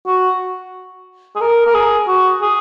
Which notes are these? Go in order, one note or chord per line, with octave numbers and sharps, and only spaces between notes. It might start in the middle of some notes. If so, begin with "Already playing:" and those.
F#4
G#4
A#4
A#4
G#4
F#4
G#4